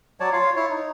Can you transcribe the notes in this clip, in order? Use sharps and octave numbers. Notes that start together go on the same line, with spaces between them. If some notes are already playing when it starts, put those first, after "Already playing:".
F#3 C#5 D5 A5
F4 C#5 F5
E4 C#5
D#4